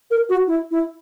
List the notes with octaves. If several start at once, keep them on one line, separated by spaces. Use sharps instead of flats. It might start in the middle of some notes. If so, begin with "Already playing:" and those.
A#4
F#4
E4
E4